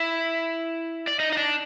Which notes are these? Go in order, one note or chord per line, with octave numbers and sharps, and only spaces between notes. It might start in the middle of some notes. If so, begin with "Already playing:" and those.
Already playing: E4 E5
D5
D#4 D#5
D#5
D4 D5